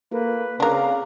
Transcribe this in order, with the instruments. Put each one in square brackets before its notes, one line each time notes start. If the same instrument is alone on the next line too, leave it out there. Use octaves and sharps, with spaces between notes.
[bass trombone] A#3 [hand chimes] F4 A4 [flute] B4
[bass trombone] C#3 [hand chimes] C4 D6 F#6 [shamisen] D4 A#4 [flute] F5